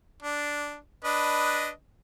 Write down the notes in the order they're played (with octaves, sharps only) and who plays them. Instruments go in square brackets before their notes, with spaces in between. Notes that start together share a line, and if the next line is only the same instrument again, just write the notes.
[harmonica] D4
D4 B4 D#5